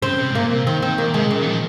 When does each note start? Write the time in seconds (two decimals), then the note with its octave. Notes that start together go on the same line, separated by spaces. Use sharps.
0.02 C#3 C4
0.18 C3
0.30 G#2
0.34 A#2 A#3
0.51 C3
0.66 D#3 C4
0.82 D#3 C4
0.98 D#3 A#3
1.07 A#2
1.14 C3 G#3
1.30 A#2 C#3
1.41 D#3
1.46 F3